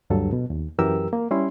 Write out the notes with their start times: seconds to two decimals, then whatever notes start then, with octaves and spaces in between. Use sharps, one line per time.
0.10 D2 G2 F#3 A4
0.33 B2
0.50 D#2
0.79 F#2 E3 F#3 G4 A#4 E6
1.13 A#3
1.31 G3 C#4 E4 C6